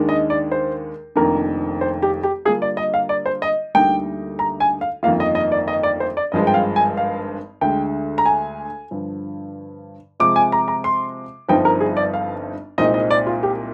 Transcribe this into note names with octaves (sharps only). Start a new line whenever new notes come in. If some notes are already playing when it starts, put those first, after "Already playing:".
Already playing: D#2 D#3 G#3 D4
D#5
D5
C5
F1 F2 D#3 A#3 D4 A#4
C5
G4
G4
D3 G3 A#3 D4 F4 G#4
D5
D#5
F5
D5
C5
D#5
D2 D3 G3 A#3 D#4 G5
A#5
G#5
F5
G1 F2 D#3 A#3 F4 F5
D#5
D#5
D5
D#5
D5
C5
D5
G#1 G2 F3 G#3 D#5
G5
F5
G#5
F5
D2 D3 G#3 G5
A#5
G#5
G2 D3 F3
C3 F3 G#3 C4 F4 D6
G#5
A#5
A#5
C6
G1 G2 F3 C4 D#4 G5
A#4
G#4
D5
F5
C2 A#2 G#3 C4 D#4 D#5
D#5
D5
F4
G4